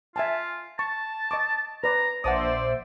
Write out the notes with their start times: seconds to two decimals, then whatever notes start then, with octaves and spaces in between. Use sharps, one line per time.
0.16 F4 E5 G#5 A5
0.79 A5 C#6
1.31 D#5 C#6 D6
1.84 B4 D5 A#5
2.24 A#1 C5 D5 E5 F#5 A5 D#6